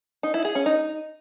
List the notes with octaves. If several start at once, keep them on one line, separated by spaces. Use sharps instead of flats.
D#4
E4
G#4
C#4
D#4